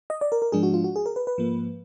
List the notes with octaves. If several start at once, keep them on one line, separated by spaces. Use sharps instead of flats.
D#5
D5
A#4
A#4
G#2 F3 G#3 D4 G#4
F#4
F4
F#4
G#4
A#4
B4
B4
G#2 F3 A#3